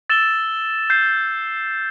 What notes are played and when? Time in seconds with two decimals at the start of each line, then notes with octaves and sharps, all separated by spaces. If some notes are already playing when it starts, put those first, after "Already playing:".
0.10 E6 A6 E7 G7
0.90 G6 C7